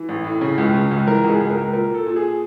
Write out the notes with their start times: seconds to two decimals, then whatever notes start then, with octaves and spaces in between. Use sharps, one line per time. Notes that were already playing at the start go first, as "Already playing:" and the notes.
Already playing: E3
0.09 A1
0.24 A2
0.41 C#3
0.58 C#2
0.73 C#3
0.91 C#2
1.07 E3 A#4
1.24 C#2
1.30 G#4
1.40 C#2
1.50 A#4
1.57 C#2
1.73 A#2 A#4
1.90 A#2 A4
2.06 A#2
2.16 G#4